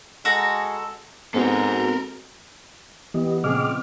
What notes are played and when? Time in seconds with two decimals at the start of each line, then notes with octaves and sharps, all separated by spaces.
0.25 G#3 F#4 A4 A#5
1.34 G#2 B3 C4 F#4 A4 A#4
3.14 E3 B3 G4 D#5
3.44 A#2 C#3 F3 C4 G#4 D#5 D6 F6